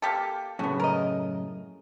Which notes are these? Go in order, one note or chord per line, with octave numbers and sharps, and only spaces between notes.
A#3 G4 A4
F#2 A2 C#3 B3 F#4
A#4 D#5